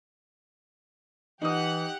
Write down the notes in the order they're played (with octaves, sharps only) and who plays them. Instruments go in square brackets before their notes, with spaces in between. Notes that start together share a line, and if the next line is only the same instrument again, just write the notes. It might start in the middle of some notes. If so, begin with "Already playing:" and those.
[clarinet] E3 [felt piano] D#4 D#6 [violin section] G4 F#5 F#6